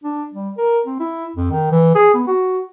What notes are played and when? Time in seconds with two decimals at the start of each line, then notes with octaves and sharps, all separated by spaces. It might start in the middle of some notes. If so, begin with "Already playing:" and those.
0.04 D4
0.34 G3
0.58 A#4
0.86 C4
1.00 E4
1.36 F2
1.51 D#3
1.72 E3
1.95 G#4
2.14 B3
2.27 F#4